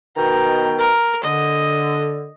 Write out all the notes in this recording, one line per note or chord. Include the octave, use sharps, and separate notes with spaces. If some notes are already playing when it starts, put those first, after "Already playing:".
B2 D#3 G5 A#5
A#4
D3 D#5